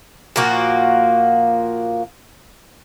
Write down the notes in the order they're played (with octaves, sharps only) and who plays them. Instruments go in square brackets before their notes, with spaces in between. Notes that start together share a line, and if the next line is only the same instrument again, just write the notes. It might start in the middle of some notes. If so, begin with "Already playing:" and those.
[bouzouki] A#2 F3 A#3 F#4